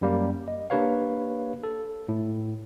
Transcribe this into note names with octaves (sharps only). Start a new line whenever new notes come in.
F#2 G3 A#3
D#5
A#3 D4 G4 B4 C#5 F5
A4
A2